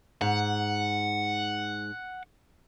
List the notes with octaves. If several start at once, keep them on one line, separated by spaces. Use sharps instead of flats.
G#2 F#5